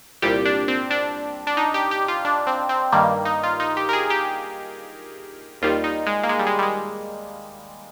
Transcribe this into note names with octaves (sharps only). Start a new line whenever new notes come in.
C2 A#2 G3 G4
D4
C4
D4
D4
D#4
G4
G4
F4
D4
C4
C4
G2 D#3 G3 A#3
D#4
F4
D#4
G4
A#4
G#4
G4
D#2 D#3 G3 F4
D#4
G#3
A#3
G#3
G3
G#3
G3
G#3